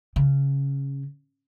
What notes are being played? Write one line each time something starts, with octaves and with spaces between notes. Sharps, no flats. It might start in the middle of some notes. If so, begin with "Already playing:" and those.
C#3